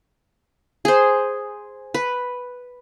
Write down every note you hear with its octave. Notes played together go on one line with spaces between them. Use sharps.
G#4 C5
B4